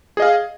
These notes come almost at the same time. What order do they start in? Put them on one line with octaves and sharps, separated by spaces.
G#4 D#5 F5